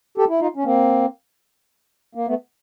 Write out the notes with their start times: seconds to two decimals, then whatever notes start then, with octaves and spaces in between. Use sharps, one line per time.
0.18 G4 A4
0.29 E4
0.40 D#4 F4
0.56 C#4
0.64 A#3 C4
2.15 A#3
2.27 A3 B3